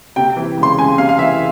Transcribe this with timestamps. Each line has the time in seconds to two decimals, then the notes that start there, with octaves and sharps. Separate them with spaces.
0.16 C3 G5
0.37 E3
0.57 C#2
0.63 C6
0.78 C#2 G#5
0.98 C3 F5
1.09 F5
1.18 E3 E5